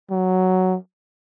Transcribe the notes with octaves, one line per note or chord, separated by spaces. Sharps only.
F#3